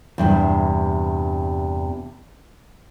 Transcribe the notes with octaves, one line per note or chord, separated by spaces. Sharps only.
E2 G2 C3